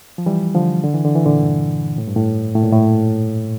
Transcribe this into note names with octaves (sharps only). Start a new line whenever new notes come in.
F3
E3 G3
D3 F3
D3
E3
D3
E3
A#2 D3
G2
A2
G2
A2
A2
A#2
A2